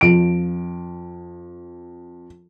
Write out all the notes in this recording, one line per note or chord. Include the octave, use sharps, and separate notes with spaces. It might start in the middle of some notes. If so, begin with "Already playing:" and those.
F2 D7